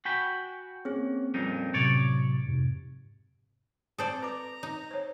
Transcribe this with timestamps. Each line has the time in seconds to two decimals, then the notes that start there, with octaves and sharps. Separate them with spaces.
0.05 F#4 G5 G#5 B5
0.85 A#3 C4 C#4 G#4 C#5
1.34 F2 A#2 G3 D#4
1.74 A2 C3 F#3 C#5 D5
2.46 F2 G#2 C3
3.98 C4 A4 C5 D5 A5 D#6
4.22 B4 A#5 D6
4.63 D#4
4.91 C5 C#5